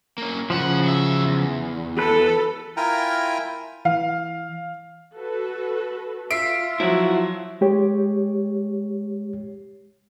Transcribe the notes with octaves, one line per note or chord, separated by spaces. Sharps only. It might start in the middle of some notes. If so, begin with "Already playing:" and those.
A#3 C#4
C#3 F3 E4 F#5
F#3 E5
E2
A4 B4
E4 F4 A#4 G5 G#5 A#5
E3 F5
F#4 A4 B4
F4 E5 E6 C7 D7
F3 F#3 E4 F#4
G#3 G4 C#5